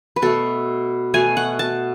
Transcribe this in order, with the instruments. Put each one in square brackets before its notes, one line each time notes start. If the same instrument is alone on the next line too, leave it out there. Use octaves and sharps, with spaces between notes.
[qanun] B4
B2 A3 A4
B2 A3 G#5
F#5
A5